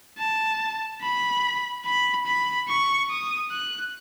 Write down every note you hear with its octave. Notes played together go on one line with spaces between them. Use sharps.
A5
B5
B5
B5
C#6
D#6
F#6